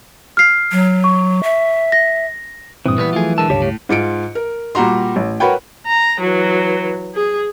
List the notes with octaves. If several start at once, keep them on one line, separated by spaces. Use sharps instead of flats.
F6 C7
F#3
C#6
E5
A#6
G2 A#2 E3 C4 D#6
A#2 G3 B3 B4 F#5
F3 F#3 A3 F4 G#4
B1 D3 G#3 A#4 A5 E6
C#2 G2 G4 C#5 F5
A2
G#2 F4 C#7 D7
A#4
A#2 G3 F#4 A#5 C6
A1
F#4 A#4 B4 C#5 G5
A#5
E3 F#3
G#4